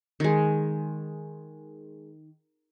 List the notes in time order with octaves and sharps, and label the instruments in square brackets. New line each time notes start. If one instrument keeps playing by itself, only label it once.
[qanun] D#3 G#3